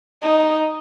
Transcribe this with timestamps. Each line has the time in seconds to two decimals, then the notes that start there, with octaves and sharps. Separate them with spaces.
0.22 D#4